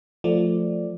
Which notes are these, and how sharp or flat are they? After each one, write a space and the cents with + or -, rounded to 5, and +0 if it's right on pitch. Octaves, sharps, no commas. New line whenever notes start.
F3 +0 A3 +5 D5 +0